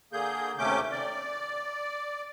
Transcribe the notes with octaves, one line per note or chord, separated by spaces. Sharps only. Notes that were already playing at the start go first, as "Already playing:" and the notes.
D3 A#3 G#4 G6
D#2 C3 A3 C#4 D6 G6
D5